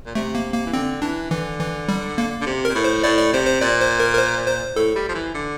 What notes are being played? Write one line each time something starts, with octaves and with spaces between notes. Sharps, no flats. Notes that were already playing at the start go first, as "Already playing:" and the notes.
A#2
C3 A3
A#3
A#3
E3
D3 C4
E3 D4
D3 E3
E3
G3
A#3
D3
C3
A#2 A#4
A2
C5
A2 D5
D5
C3 C5
C5
A#2 D5
C5
A#4
A#4
C5
C5
A2 A4
G3
F3
E3
D3